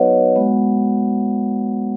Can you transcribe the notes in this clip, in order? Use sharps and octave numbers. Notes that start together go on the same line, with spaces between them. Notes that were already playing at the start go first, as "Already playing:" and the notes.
Already playing: F#3 B3 D#4 F#4 B4 C#5 D#5 F#5
G#3 B3 F#4